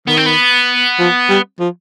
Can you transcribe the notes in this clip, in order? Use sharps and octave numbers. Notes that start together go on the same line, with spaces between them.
D#3 B3
C4
B3
F3
G3
F3